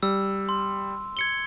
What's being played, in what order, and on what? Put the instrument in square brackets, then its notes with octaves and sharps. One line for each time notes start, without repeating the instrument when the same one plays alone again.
[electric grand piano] G3 [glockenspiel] E6
[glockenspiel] C6
G#6 C#7 G7